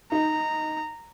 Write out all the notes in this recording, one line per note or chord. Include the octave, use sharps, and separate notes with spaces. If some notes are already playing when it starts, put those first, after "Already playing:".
D#4 A#5